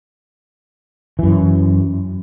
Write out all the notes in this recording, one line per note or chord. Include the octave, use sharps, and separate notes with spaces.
F#2 E3